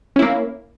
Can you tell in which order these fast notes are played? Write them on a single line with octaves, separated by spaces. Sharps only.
C#4 E4 A#3